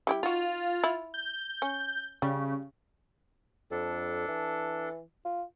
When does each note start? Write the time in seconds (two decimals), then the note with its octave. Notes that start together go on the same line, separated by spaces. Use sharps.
0.07 G3 E4 G4
0.23 D#4 F4 F#4
0.84 E4
1.14 G6
1.62 C#4
2.22 C#3 G3
3.71 F2 D4 A4
4.28 E3
5.25 F4